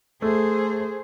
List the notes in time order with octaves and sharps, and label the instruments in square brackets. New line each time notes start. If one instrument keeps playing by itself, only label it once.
[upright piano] A3 [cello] G#4 C5